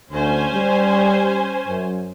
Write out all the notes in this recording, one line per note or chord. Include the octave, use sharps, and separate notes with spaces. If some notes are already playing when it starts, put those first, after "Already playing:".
D2 C#4 C5 G#5
G3
F#2